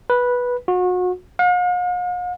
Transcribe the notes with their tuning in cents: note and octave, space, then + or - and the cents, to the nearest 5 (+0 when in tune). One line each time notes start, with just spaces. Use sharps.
B4 -10
F#4 -35
F5 +45